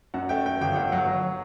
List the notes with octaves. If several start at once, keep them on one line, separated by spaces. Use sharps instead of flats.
F#2 F#5
A3 G5
A3 G5
G1 G5
G1 F#5
F#3 F#5
F#3